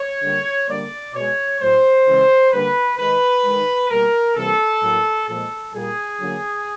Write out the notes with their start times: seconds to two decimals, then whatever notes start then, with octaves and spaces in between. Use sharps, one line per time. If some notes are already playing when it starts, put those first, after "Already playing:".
Already playing: C#5
0.22 D3 G3 A#3
0.68 D3 G3 A#3 D5
1.13 B2 G#3 C#5
1.60 A2 F#3 A3 C5
2.05 C#3 E3 G#3
2.51 D3 G3 A#3 B4
2.97 D#3 G#3 B4
3.43 D#3 G#3
3.89 B2 G3 A#3 A#4
4.35 C3 E3 G3 A#3 A4
4.81 A2 F#3 A#3
5.27 A#2 F3 G#3 A4
5.73 A#2 G3 A#3 G#4
6.19 D3 F#3 A#3